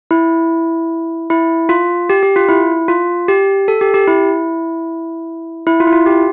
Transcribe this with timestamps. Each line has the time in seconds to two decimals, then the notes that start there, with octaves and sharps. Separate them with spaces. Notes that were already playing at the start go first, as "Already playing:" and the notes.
0.11 E4
1.30 E4
1.69 F4
2.10 G4
2.23 G4
2.36 F4
2.49 E4
2.88 F4
3.28 G4
3.68 A4
3.81 G4
3.94 G4
4.08 E4
5.67 E4
5.80 F4
5.87 E4
5.93 F4
6.06 G4